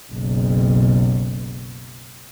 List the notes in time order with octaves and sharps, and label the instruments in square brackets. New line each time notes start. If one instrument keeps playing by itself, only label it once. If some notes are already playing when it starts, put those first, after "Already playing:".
[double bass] F#1 B1